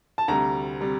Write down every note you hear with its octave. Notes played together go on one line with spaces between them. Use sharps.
A5
D2 C3 G3 A#5
C3 G3